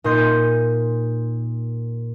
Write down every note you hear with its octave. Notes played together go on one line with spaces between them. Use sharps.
A#2 D#4 D#5 C6 G6